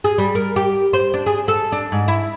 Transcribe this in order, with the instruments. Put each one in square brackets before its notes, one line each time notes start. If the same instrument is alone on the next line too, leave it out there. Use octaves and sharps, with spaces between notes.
[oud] G#4
G3
A#4
G4
C5
D4
G#4
A4
D4
G#2
E4